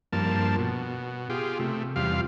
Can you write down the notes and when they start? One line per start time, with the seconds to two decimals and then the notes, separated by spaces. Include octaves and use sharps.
0.13 G2 F3 A#3 A5
0.58 B2
1.30 F4 G4 G#4
1.59 C3 A3
1.96 E2 C3 G3 F4 F5